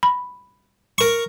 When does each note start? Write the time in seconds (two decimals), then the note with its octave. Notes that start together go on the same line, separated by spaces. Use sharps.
0.03 B5
0.98 A#4 C#6